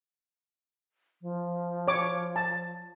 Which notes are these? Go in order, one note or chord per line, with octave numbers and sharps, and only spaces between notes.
F3
C#5 D6
A5